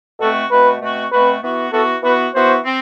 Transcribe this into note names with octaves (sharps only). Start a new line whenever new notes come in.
B2 A3 C4 F#4 A4
B2 A3 C4 F#4 B4
B2 A3 C4 F#4
B2 A3 C4 F#4 B4
E3 B3 F#4
E3 B3 F#4 A4
E3 B3 F#4 B4
E3 B3 F#4 C5
C4